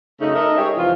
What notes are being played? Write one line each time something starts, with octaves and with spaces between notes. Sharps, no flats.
F#2 C#3 A3 D#4
D#4 A4 A#4 D#5 E5
G#3 G4 G#4 C#5
F2 C3 E3 F3 E4 F4